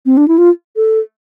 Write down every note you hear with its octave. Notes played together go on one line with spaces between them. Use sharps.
C4
D4
E4
F4
A4